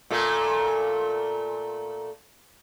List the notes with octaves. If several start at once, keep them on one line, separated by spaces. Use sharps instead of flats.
A#2 A3